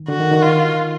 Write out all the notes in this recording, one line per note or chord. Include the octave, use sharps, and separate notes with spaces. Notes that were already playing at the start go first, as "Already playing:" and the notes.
Already playing: D#3
D3 F#4
D#3
D#3
F4